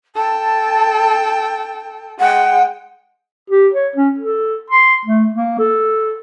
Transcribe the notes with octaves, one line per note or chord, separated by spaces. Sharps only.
A4 G5 A5
G#3 F#5 G5
G4
C#5
C#4
A4
C6
A3
A#3
A4